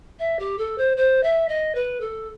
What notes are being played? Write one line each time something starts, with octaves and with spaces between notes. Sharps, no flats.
E5
G4
A4
C5
C5
E5
D#5
B4
A4